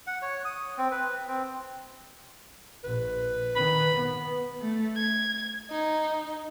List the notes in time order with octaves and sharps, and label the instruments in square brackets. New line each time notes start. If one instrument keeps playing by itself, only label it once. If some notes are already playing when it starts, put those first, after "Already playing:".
[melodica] F#5
C#5
D#6
C4
B4
C4
[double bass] A#1 [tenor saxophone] B4
[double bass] D#3 [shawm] B5
[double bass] B3
[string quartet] A3
G#6
D#4